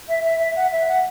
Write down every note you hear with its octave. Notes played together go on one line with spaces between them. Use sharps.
E5
E5
E5
F#5
E5
F#5